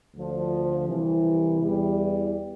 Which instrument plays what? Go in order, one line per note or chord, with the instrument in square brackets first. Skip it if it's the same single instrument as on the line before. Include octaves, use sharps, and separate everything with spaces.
[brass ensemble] D2 D3 F3
C2 C3 E3
E2 E3 G3